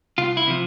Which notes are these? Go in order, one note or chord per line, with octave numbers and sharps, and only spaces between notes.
C2 F4
E4
C3 F3